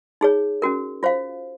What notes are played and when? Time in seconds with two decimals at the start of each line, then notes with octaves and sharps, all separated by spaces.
0.21 D#4 G#4 C#5
0.62 C#4 F#4 A#4
1.03 F4 C5 F5